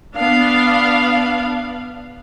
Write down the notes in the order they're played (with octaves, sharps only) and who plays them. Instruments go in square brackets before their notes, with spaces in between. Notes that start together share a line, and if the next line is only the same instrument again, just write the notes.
[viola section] B3 D4 F5